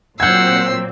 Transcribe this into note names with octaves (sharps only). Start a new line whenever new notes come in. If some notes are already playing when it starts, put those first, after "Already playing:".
A#2 F#3 C4 F#5 E6 G6 G#6 C7